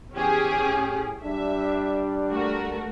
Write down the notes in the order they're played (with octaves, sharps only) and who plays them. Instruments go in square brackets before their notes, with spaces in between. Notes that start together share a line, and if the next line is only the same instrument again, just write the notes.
[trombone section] E2 [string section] C#4 G4 G#4
[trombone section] A2
[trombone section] G3 D4 [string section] E5
[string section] A3 F#4 A#4